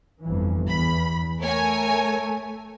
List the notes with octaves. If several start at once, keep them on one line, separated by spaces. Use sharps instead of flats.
G1 F2 E3
E2 B5
A3 A#4 C#5 G#5